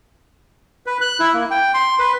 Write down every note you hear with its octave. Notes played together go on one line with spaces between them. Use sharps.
B4
F#6
E4
A#3
G5
C6
B4